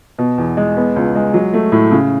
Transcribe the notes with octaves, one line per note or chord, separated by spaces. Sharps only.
B2
E2
G#3
B3
C#2
G#3
F#3
A3
A2
C#3